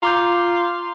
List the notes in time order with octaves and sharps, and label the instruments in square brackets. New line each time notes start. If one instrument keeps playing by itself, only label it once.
[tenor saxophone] F4 [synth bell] A#5 D6 G6